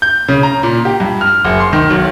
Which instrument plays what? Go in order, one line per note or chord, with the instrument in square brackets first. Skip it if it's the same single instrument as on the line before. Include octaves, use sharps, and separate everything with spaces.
[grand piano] G6
C#3
A#5
A#2
G4
G2
F6
F#1
C6
D#3
B1